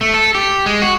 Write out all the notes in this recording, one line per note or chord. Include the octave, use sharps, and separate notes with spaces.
A3
A4
G4
G#3
F#4